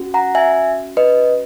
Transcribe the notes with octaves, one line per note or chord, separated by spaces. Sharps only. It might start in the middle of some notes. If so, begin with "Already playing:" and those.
Already playing: C#4 F#4
F#5 A#5
E5 G#5
B4 D#5